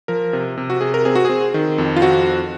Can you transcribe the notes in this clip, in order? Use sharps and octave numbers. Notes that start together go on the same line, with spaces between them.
F3 A#4
C3
C3
F#4
C3 G#4
A#4
C4 G#4
F#4
C4 G#4
D#3
F2
F4
C4 F#4